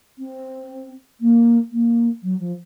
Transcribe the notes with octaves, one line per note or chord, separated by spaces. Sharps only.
C4
A#3
A#3
F#3
F3